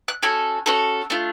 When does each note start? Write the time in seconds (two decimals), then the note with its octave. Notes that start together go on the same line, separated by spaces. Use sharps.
0.08 F#6
0.23 C#4 F#4 A4 G#5
0.66 C#4 F#4 A4
1.10 A3 D4 F4